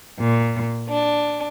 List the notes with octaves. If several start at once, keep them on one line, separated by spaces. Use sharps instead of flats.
A#2
D4